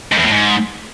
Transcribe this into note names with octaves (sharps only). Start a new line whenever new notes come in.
G#2
E2
A2
G#2